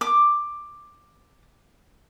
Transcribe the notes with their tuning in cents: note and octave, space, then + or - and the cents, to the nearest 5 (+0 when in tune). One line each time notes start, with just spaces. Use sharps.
D6 +10